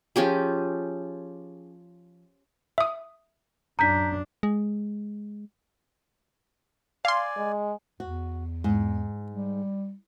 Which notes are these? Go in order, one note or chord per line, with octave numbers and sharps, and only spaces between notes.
F3 C#4 G4 G#4
E5 D#6
F#2 D4 A#5 G6 B6
G#3
D5 F5 G#5 C6
G#3
E2 F#4
G#2
G3